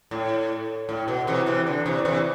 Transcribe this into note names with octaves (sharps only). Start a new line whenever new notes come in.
A2
A2
B2
C3 E3
C3 E3
D3
C3 E3
C3 E3